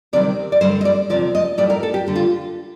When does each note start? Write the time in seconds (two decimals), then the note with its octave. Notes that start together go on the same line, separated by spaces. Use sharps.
0.13 D2 C3 D#3 G3 D5
0.52 D5
0.61 G2 D3 G3 C5
0.81 D#5
0.85 D5
1.10 D2 C3 F3 D5
1.35 D#5
1.58 A2 G3 D5
1.70 A#4
1.83 A4
1.94 G4
2.07 D3 G3
2.16 F4